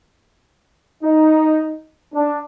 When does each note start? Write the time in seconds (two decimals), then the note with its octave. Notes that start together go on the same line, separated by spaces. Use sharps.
1.04 D#4
2.14 D4